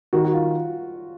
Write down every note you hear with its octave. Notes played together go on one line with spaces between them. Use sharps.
D#3 F#4
F#4
F4